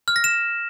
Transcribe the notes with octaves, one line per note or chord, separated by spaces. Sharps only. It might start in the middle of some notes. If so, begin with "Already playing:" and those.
F6
A#6
E7